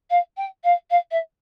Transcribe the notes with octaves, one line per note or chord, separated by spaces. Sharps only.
F5
G5
F5
F5
E5